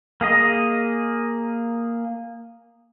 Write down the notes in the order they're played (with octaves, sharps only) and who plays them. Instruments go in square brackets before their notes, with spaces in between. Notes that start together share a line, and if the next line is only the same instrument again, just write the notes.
[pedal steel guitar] A#3 G#4 D#5